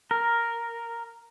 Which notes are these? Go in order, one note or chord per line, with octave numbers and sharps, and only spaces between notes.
A#4